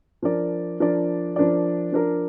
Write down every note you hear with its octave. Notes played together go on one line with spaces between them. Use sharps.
F3 D4 A#4 D5
F3 D4 A#4 D5
F3 D4 A#4 D5
F3 D4 A#4 D5